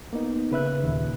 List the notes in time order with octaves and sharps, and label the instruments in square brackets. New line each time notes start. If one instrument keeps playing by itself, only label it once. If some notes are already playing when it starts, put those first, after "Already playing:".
[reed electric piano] A#3 B3 D#4
C#3 B4 E5 F#6
D#2 A#2